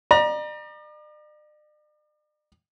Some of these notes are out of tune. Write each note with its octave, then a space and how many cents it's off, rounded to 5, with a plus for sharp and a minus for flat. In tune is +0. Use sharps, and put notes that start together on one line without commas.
D5 +45 A#5 +30